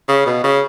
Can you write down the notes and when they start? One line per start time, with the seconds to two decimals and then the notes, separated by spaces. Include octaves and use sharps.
0.08 C#3
0.26 B2
0.44 C#3